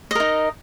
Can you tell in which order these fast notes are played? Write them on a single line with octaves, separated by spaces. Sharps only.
D#5 A#4 D#4